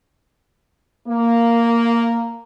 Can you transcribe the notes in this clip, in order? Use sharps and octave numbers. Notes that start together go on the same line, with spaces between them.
A#3